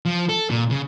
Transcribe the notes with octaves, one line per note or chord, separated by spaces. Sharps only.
F3
A4
A#2
C#3